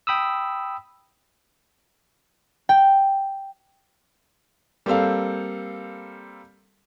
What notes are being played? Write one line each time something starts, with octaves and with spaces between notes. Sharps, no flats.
G5 B5 D#6 E6
G5
G3 A#3 C4 A4 F5